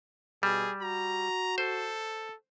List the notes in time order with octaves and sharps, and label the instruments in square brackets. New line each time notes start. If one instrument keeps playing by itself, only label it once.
[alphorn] B2 [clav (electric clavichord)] G3 [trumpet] G#4
[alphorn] F#4 [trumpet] A#5
[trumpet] A4 [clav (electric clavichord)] C5